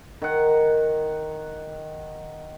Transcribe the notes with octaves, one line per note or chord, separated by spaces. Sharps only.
D#3 F#5